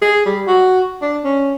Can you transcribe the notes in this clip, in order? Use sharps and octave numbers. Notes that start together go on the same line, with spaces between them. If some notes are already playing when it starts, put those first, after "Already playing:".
G#4
G3
F#4
D4
C#4